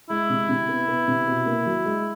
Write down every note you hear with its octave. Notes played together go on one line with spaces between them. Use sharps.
G#3 E4
C3
C3
B3
B3
C3
B2
A#3
F#3
G#3